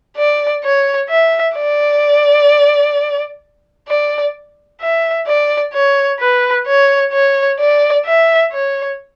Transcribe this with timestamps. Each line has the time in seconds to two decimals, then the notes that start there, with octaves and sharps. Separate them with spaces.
0.17 D5
0.64 C#5
1.10 E5
1.57 D5
3.88 D5
4.81 E5
5.27 D5
5.74 C#5
6.20 B4
6.67 C#5
7.13 C#5
7.60 D5
8.06 E5
8.52 C#5